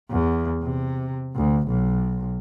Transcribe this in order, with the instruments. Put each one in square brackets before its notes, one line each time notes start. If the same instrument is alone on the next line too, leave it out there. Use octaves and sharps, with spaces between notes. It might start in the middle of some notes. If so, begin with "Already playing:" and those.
[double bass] E2
C3
D2
B1